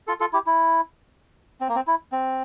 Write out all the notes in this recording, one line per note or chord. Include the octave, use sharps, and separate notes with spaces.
F4 A4
F4 A4
E4 G4
E4
C4
A#3
C4
E4
C4